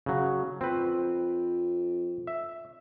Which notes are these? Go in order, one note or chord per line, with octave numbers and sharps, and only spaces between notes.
C#3 F#3
F2 C4 B4
E5